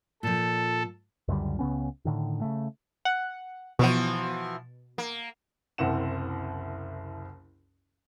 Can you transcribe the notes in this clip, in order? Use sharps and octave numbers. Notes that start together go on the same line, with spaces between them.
A#2 F3 A4
C#2 F#2 D3 G3
C#2 C#3 B3 C#4
A2 D3 D#3
C#3 A3
F#5
B2 E3 F3 F#4
A#3
F#1 C2 C4 F#5 E7